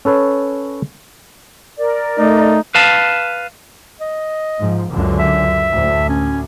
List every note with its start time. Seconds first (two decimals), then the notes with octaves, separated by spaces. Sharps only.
0.05 C#4 A4 B4 C#5
1.77 A#4 D5
2.18 A3 D#4
2.75 B4 F5 A5
4.01 D#5
4.58 G#2 F3
4.90 C#2 F#2 D3
5.19 E5
5.69 D2 A2
6.09 C#4